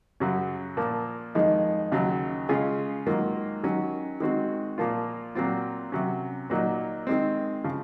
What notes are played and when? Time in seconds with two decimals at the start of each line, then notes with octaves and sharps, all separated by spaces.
0.20 F#2 C#3 F#3 C#4
0.77 A#2 F3 A#3
1.35 F2 D#3 G#3 D#4
1.92 D#2 C#3 F#3
2.49 C#3 G#3 C#4 F4 G#4
3.06 G#2 D#3 F#3 A#3 F4
3.63 D#3 F#3 C#4
4.20 D#3 G#3 C4 F#4
4.78 A#2 F3 A#3 F4
5.35 A#2 F#3 C4 F4
5.92 C3 F#3 C#4
6.50 A#2 F#3 A#3 D#4
7.07 D#3 G#3 C4
7.64 C#3 F3